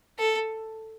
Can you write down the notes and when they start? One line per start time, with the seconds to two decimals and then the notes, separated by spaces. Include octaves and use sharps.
0.19 A4